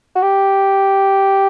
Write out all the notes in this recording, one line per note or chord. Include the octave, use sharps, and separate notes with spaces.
F#4
G4